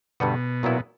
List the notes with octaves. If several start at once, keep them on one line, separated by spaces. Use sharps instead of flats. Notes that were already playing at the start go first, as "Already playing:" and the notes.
G2 B2 D3 G3 B3 F#4
A#2 F#3 B3 E4